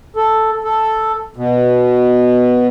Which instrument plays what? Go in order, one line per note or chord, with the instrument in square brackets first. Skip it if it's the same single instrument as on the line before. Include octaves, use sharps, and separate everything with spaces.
[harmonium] A4
A4
B2